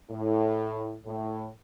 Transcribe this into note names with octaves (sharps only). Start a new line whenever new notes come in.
A2
A2